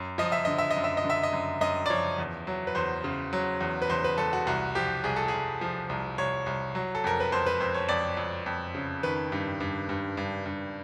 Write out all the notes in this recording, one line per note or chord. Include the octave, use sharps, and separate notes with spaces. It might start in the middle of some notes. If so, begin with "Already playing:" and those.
Already playing: F#2
F3 D#5
E5
D3 D#5
E5
D#5
F#2
E5
D#5
D3
E5
D#5
F#2
F#2 D#5
D5
F3 C#5
E2
F#3
B4
E2 C5
C#3
F#3
E2
B4
E2 C5
B4
E2 A4
F#4
C2 F#4
F3 G4
C2 G#4
A4
C2 G#4
F3
C2
C2 C#5
C2
F#3
A4
F2 A#4
B4
F2 C5
B4
F2 C5
C#5
F2 D5
F2
F2
C#3
D#3 B4
G2
G2
G2
G2
G2